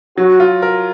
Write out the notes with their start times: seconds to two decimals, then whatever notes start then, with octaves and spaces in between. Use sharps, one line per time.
0.17 F#3 F#4
0.40 F4
0.62 A#4